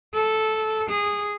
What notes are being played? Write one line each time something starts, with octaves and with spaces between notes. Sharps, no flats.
A4
G#4